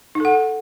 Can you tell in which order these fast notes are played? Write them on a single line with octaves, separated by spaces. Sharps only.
D#4 A4 F#5